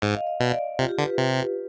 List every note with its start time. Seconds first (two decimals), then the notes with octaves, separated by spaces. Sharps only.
0.02 G#2 D#5
0.15 F5
0.27 D#5
0.40 B2 D5
0.79 C3 F4
0.89 G4
0.98 D3 B4
1.08 G4
1.18 C3